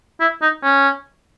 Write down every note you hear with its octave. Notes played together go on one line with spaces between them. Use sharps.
E4
D#4
C#4